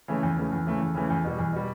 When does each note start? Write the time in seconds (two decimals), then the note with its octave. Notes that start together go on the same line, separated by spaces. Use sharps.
0.08 C#3 E3 A3
0.23 E2
0.37 C#3 E3 A3
0.52 E2
0.67 C#3 E3 A3
0.81 E2
0.94 C#3 E3 A3
1.10 E2
1.25 B2 G3
1.39 E2
1.53 B2 G3